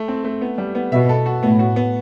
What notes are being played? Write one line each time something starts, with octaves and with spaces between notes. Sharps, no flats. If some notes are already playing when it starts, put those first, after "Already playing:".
Already playing: A3
C4
A3
B3
G3
B3
B2 E5
A4
F#4
A2 B3
F#4
B3